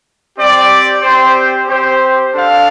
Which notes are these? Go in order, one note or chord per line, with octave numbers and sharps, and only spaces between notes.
C4 G4 D5
C4 G4 C5
C4 G4 C5
D4 A4 F5